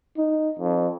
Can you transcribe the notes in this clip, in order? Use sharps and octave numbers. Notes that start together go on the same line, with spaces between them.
D#4
F2